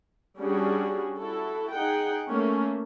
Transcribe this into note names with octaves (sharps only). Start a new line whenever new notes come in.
G3 C#4 D4 F#4 G#4
E4 F#4 A4
D#4 G#4 F#5 G5
A3 A#3 C#4